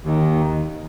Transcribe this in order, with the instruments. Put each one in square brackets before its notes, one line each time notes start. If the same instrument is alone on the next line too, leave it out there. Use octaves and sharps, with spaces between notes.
[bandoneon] D#2 D#3